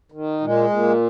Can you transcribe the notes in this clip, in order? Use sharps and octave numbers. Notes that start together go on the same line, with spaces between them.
D#3
A#2 G#3
A#2